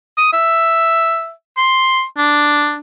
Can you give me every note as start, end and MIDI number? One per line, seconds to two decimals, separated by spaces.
0.17 0.28 87
0.33 1.31 76
1.57 2.04 84
2.17 2.77 62